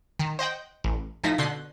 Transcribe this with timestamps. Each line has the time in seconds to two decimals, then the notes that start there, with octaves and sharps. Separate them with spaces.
0.19 D#3
0.39 C5 D#5 F#5 G5
0.84 A1
1.24 A2 F3 D#4 D#5 B6 D#7
1.38 B2 D3 A4 C6 F#6 D#7